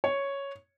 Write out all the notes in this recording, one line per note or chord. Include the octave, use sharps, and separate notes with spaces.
C#5